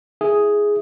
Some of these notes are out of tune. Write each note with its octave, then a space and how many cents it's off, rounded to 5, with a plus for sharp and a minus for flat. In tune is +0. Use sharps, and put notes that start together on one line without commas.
E4 -25 G#4 +0 E5 +0